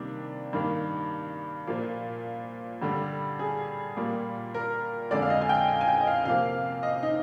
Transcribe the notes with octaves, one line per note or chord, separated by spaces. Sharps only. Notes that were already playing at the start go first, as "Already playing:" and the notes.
Already playing: C3 D#3 G3 A#3 D4
G2 D#3 A#3
A#2 F3 A#3
G2 D3 G3
G#4
A#2 G3 A#3
A#4
F2 D3 G#3 D5
F5
D#5
G#5
G5
G#5
G#5
G5
D#5
F5
C3 F3 A#3 F5
D#5
D#4